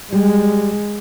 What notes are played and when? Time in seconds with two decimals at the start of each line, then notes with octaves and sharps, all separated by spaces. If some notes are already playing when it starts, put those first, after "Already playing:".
0.12 G3 G#3